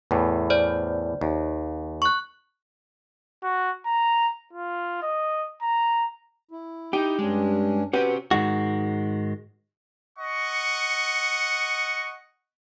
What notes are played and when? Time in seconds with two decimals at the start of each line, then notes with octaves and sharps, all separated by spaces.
0.11 E2 A2
0.50 C5 D5
1.21 D#2
2.02 C#6 F#6
3.43 F#4
3.86 A#5
4.53 F4
5.03 D#5
5.62 A#5
6.51 E4
6.93 D#4 G4
7.19 G2 G#3 C#4 D4
7.93 C#4 F#4 G4 B4 C5
8.31 G#2 D#3 G#3 F#4
10.18 D#5 F#5 C#6